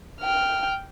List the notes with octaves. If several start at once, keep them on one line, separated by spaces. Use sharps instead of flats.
G5 F6